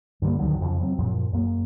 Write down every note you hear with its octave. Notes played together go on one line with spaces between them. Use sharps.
G2 D3 G3 A#3
D2 D3 D#3 F#3
F2 C#3 F3
F#3 C4
F#2 A#2 F3
F#2 A#3